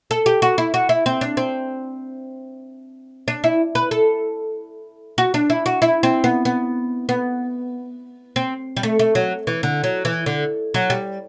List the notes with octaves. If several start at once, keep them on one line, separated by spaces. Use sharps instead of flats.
A4
G4
F#4
E4
F#4
E4
C4
D4
C4
D4
E4
B4
A4
F#4
D4
E4
F#4
E4
C4
B3
B3
B3
C4
G3
A3
A3
F#3
E3
D3
F#3
E3
D3
F#3
G3